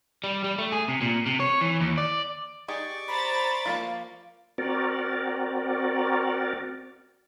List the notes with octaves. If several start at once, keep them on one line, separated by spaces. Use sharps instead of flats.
G3
G3
A3
G#4
C3
A#2
C3
C#5
E3
D#2
D5
D#4 G4 G#4 D5 C#6 D6
C5 A#5 B5 A6
F3 G3 A#3
C4 F#4 A#4 D5